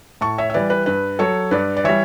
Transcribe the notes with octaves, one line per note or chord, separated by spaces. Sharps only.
A2 A5 C#6
C#5 E5
E5
E3 G3 B4 D5
B4
G2 B4
F#3 A4 C#5
G2 B4 D5
D5
E3 G3 C#5 E5